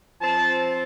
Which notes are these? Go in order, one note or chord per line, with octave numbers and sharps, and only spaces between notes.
F3 C4 A5